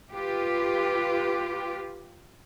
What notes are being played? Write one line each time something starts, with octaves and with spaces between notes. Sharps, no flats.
F4 G4 B4